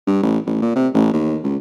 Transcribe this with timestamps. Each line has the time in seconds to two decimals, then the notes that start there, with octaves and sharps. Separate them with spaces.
0.07 G2
0.23 A1
0.47 A1
0.62 A#2
0.76 C3
0.94 A1
1.14 D#2
1.44 C#2